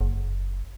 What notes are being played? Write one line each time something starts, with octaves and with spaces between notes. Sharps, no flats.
F#1